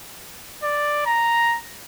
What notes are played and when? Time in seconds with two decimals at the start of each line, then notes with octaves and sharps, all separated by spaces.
0.63 D5
1.06 A#5